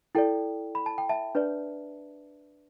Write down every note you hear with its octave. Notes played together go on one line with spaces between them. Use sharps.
E4 A4 D5 G5
B5
A5
G5
E5 A5
D4 B4 D5